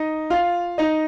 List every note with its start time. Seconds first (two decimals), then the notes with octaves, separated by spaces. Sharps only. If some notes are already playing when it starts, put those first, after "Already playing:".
Already playing: D#4 D#5
0.30 F4 F5
0.78 D#4 D#5